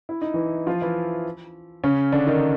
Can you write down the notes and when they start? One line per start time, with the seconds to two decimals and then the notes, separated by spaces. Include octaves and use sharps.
0.09 E4
0.22 D#4
0.34 E3 E4
0.67 F3 F4
0.82 E3 E4
1.84 C#3 C#4
2.12 D3 D4
2.27 D#3 D#4